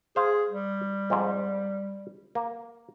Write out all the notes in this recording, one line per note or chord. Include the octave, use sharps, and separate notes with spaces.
G#4 C5 F5
G3
F2 G#2
A#3